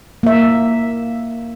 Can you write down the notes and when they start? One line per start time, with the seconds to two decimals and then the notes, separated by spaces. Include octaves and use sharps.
0.23 A#3 E5